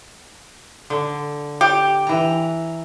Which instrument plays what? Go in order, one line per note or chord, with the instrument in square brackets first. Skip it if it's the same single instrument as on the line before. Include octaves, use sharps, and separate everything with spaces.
[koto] D3
[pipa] G4
[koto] E3 A#5